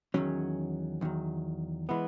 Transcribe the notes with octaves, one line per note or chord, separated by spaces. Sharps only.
E2 D#3 F#3 C#4
E2 D#3 F#3
E3 G#3 B3